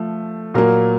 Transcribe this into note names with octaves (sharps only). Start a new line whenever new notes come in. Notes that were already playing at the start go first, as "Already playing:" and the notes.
Already playing: F3 A3
A#2 F#3 A#3 A#4